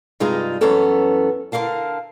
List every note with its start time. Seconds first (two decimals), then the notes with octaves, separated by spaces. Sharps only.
0.20 G2 C3 G#3 D#4 F4 A#5
0.61 F#2 E3 B3 C#4 A4 A#5
1.52 D3 G4 A#4 F5 A5